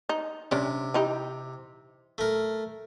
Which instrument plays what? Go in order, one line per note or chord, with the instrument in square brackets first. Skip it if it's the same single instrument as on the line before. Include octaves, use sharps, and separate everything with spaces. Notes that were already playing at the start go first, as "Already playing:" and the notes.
[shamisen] D#4
[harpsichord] C3 [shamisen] C#4 D4
[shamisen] E3 D#4 G4
[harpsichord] A3 A#4